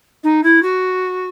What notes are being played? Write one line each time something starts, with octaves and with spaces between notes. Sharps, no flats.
D#4
E4
F#4